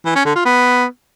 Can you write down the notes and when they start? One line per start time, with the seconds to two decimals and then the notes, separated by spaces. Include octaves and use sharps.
0.05 E3
0.15 C#4
0.25 D3
0.35 F4
0.45 B3